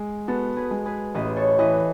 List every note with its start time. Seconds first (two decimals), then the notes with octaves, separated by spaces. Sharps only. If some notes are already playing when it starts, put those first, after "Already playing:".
Already playing: G#3 G#4
0.28 B3 F#4 A4
0.56 G#4 B4
0.71 G#3
0.85 G#4 B4
1.15 A1 B4 D#5
1.36 A4 C#5
1.59 E3 B4 D#5